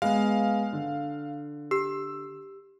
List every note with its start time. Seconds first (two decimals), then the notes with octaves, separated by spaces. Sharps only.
0.02 G#3 B3 F5
0.73 D3
1.71 G4 E6